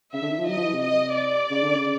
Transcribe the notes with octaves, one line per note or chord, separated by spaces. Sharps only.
C#3 E5
D3
D#3
F3
F#3 D#5
F3
E3
C3
D#5
D5
C#3
D3
C#3